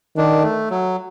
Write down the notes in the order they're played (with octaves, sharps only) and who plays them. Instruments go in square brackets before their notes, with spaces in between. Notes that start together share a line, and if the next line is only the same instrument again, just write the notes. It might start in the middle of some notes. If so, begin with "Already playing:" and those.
[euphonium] D#3 [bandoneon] D4
[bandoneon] A3
F#3